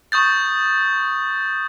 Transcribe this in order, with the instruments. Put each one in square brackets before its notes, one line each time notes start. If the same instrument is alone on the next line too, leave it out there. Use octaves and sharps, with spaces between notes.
[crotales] C#6 D#6 G6 A6